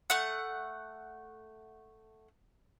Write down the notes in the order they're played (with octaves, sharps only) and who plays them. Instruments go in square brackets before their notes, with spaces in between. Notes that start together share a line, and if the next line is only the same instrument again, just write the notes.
[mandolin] A3 F#5